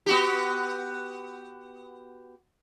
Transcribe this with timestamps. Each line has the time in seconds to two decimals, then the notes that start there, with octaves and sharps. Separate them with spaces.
0.06 B3 F#4 G4